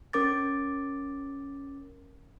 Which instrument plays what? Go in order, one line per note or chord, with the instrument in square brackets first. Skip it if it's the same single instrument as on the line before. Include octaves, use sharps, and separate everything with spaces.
[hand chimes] C#4 A#4 D6 A6